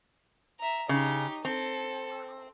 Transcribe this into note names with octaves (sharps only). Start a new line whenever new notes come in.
E5 A#5
C#3 D#4 G4
C4 A4